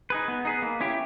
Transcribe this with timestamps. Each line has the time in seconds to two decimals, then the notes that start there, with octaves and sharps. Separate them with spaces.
0.10 D#4 G#4 B4
0.28 B3
0.45 D#4 G#4 B4
0.62 A#3
0.80 C#4 E4 G4